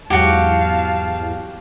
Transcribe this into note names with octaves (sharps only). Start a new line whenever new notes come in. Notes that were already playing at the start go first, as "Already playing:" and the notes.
E2 G#2 F#3 F#4 G4 F5 A5